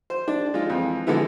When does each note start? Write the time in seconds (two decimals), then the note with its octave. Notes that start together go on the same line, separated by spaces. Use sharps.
0.10 C5
0.28 D4
0.54 G#3 D#4 F4
0.70 F2 E3
1.07 D3 E3 G#3 B3 E4